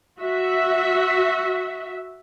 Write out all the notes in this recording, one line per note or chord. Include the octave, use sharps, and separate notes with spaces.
F#4 E5